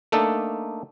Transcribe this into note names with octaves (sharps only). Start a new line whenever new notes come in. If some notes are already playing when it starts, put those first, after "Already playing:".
A3 A#3 D4 D#4 A4